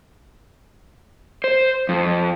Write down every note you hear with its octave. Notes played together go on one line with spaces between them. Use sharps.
C5
F2